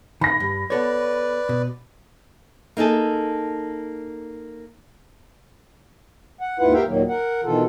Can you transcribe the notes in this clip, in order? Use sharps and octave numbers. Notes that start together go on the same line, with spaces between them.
D#3 B5 A#6
G2
B3 A4 B4 C#5 D5
B2
A#3 D#4 G#4 A4
F#5
D#2 G#2 E4 F4 B4 F#5
G4 A#4 E5 F5 G5
D#2 A#2 D#3 F#3 A#3
A#4 F#5
B2 D#3 E3 F4 A4